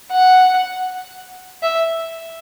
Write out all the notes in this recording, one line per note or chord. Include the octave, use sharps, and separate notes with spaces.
F#5
E5